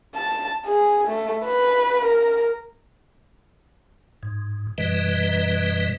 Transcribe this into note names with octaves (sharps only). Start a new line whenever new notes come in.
A5
G#4
A3
B4
A#4
G#2
F#2 B2 E3 G3 B4 D#5